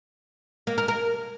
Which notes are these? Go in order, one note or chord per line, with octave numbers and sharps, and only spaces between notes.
A#3
A#4
A#4